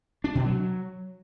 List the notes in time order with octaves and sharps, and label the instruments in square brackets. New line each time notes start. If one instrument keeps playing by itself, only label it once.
[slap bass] D4
B2
F#3